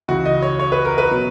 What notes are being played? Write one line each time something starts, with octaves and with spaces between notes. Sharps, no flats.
C#2 C#3 E3 F#4
D#5
C#5
C#5
B4
A#4
B4
B2 F#3